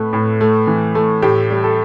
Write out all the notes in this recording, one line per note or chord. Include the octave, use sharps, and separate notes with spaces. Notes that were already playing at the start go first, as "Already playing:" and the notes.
Already playing: A2 A3 B4
A2
A3
E3
A3
A2 G4
G3
A4